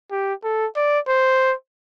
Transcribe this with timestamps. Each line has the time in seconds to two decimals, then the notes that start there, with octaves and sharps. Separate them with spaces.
0.11 G4
0.44 A4
0.76 D5
1.08 C5